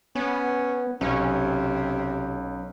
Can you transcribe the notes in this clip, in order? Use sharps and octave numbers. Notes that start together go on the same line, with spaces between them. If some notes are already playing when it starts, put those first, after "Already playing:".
B3 C#4
B1 C3 C#4